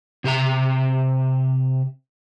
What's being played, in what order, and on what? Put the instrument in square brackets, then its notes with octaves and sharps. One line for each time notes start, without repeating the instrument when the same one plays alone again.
[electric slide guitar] C3 G4 E5 A#5